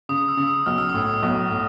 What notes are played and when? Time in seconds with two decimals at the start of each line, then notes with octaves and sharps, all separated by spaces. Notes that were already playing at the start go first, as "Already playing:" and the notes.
0.09 C#3 D#6
0.28 E6
0.37 C#3
0.47 D#6
0.66 B1 F6
0.78 E6
0.89 A2 D#6
1.02 E6
1.23 B1
1.51 A2